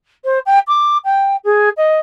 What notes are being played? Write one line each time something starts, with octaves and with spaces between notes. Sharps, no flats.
C5
G5
D6
G5
G#4
D#5